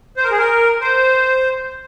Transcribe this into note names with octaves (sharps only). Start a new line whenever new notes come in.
C5
A#4
G#4
A#4
C5